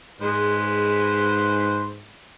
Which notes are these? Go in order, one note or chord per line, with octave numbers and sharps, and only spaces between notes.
G#2 G#3 B4 C5